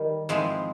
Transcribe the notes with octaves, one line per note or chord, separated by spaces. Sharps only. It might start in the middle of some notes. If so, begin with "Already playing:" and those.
Already playing: D#3 G3
G#2 F3 G#3 C4 E4